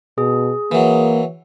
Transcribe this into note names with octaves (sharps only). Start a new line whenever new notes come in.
B2 G#4
E3 F#3 A#3